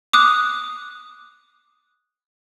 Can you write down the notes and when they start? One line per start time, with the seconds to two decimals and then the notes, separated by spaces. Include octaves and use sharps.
0.13 D6 D#6 F#6